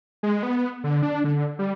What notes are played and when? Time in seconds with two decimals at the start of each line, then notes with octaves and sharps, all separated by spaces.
0.23 G#3
0.43 B3
0.84 D3
1.03 D4
1.24 D3
1.59 G3